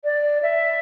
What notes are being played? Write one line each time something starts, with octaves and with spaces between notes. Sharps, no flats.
D5
E5